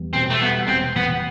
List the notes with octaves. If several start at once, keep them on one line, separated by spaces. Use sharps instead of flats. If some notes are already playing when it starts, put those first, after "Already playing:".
Already playing: E2 G3
B2 C4
A3
G3 B3
E1 C4
E2 B3